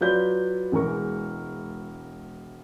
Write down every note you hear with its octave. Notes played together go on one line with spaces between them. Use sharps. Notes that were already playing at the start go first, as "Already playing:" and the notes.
F#3 F4 B4 D5 G6 G7
E1 E3 G#3 A#4 C#6